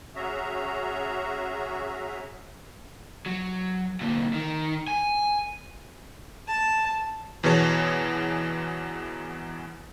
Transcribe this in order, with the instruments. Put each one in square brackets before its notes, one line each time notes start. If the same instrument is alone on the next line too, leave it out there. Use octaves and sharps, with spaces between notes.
[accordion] C#4 F#4 G#4 E5 A#5
[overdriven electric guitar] F#3
D2 A#2
D#3
G#5
[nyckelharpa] A5
[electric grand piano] E2 B2 E3 G#4 C#5 A5